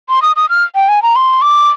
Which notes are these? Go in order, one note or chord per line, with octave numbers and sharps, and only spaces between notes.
C6
D#6
D#6
F6
G5
G#5
A#5
C6
D6